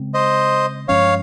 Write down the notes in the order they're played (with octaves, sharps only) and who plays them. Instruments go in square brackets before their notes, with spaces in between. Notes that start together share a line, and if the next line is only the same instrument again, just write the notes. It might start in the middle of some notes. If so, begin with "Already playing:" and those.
Already playing: [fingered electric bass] C#3 G#3 C4
[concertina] C5 D#5
[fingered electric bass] G2 F3 G#3 C#4 [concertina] C#5 F5